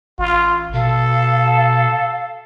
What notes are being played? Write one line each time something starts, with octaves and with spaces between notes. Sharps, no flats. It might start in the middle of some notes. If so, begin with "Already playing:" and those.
A1 F4
B2 A4 F5